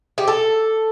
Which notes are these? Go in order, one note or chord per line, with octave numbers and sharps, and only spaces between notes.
G4
A4